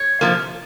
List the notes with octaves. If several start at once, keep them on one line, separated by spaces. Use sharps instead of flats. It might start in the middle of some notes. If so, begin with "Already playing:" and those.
Already playing: C#5
C3 F3 A#3